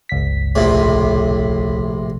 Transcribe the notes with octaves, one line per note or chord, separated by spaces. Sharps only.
G1 C#2 B6
A#1 A2 C3